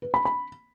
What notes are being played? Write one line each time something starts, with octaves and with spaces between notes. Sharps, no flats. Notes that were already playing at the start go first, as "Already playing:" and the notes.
B4
B5
B5